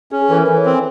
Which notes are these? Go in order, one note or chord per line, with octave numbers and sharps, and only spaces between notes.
C#4 G#4
G#4
E3 A4
A#4
E3 B4
C#5
C4